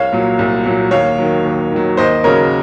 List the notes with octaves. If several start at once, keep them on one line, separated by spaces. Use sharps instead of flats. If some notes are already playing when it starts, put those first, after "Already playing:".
Already playing: C2 C#5 F5
A#2 F#3
C2
A#2 F#3
D#2 C#5 F5
D#3 F#3
D#2
D#3 F#3
D#2 C5 D#5
C#3 F#3 A#4 C#5